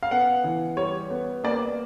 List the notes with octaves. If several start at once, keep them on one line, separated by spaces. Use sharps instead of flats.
F5
B3 F#5
E3
G3 C#5
B3
A#3 D5